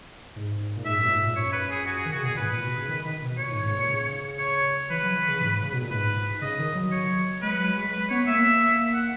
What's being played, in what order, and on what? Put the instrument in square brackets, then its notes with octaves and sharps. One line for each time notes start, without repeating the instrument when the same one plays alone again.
[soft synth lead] G#2
A#2
[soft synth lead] G#2 [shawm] E5
[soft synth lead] F#2
A#2
G#2
A#2
[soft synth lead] F#2 [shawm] C#5
[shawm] B4
G#4
F#4
G#4
[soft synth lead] D#3
[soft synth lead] C#3 [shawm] F#4
[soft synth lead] B2
[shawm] G#4
[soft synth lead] A#2
[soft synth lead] G#2 [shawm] B4
[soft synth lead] A#2
B2
C#3
D#3
D#3
B2
[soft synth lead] A#2 [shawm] C#5
[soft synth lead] G#2
G#2
A#2
C#3
[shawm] C#5
[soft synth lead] E3 [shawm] B4
[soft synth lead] F#3
E3
C#3
G#2
C#3
B2
A#2
[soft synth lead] G#2 [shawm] B4
[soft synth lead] C#3 [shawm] D#5
[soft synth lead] D#3
F#3
[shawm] C#5
[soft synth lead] G#3 [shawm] B4
[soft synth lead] F#3
G#3
[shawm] B4
[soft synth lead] B3 [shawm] C#5
[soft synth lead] A#3 [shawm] E5
[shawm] F#5